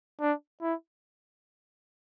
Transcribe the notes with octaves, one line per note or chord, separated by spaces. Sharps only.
D4
E4